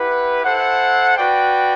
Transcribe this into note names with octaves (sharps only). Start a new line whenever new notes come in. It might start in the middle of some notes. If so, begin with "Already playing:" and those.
Already playing: E4 G4 B4 F#5
E4 A4 C5 F#5
F#4 B4 D5 G5